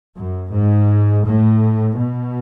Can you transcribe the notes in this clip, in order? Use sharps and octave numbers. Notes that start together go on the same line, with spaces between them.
F#2
G#2
A2
B2